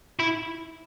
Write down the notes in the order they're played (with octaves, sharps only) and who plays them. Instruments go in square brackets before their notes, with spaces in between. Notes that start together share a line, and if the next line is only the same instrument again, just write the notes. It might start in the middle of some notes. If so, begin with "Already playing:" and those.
[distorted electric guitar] E4